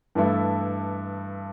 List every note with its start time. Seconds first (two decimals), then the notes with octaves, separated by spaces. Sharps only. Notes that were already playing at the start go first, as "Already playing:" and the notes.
0.15 G2 E3 A3 E4